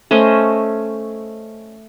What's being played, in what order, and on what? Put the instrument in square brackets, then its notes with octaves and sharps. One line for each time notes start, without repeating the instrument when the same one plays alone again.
[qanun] A3 C#4 C5 D#5